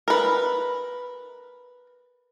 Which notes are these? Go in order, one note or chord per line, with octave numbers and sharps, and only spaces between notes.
A#4 B4